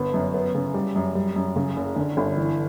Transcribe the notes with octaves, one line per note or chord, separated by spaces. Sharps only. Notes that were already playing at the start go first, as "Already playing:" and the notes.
Already playing: G1 B3
F#2
B3
C#3
G3
F#2
G3
F#2
C#3
F#1
D3
G1
E3